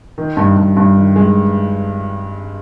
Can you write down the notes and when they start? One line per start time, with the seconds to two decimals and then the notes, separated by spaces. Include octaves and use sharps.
0.18 D#3
0.37 G2
0.57 G2
0.77 G2
0.96 D#3
1.16 G#3